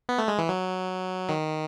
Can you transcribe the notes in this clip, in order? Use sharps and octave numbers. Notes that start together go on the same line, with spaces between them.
B3
A3
G#3
E3
F#3
D#3